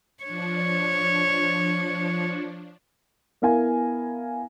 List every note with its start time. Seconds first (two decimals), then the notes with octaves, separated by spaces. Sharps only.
0.24 F3 D4 C#5
3.42 B3 E4 A#4 F5 G#5